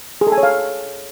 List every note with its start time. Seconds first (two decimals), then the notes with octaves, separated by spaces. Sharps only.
0.21 G#4
0.27 A4
0.32 G#5
0.38 C#5
0.43 F5